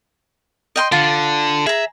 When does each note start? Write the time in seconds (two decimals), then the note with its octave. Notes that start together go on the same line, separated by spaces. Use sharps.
0.76 D#5 G5 C6
0.92 D3 F4
1.67 G#4 E5 A#5